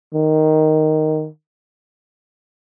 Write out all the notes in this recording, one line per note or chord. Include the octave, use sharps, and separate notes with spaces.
D#3